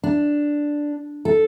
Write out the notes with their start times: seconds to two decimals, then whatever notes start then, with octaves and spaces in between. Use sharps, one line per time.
0.03 D4
1.25 A4